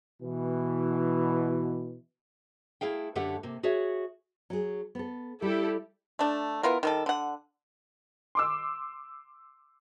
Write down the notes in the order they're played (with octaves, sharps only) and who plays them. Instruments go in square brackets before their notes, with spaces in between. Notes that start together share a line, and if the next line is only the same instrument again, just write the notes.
[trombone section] B2 E3
[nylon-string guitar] A3 E4 G#4 F5 G5
F#2 D3 A3 G4 F#5
C3 A#3
F#4 G#4 C#5 E5
F#3 G#4
B3 A4
[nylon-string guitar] G3 [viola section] E4 G4 A4
[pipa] A3 D4
B3 E4 F4 A#4
D#3 G3 A4
D3 F#5
[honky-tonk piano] C6 D6 E6